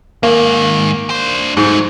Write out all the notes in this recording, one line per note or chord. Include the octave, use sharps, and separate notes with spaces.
G#2 D#3 A#3
D4 C5
G#2 F#3 A3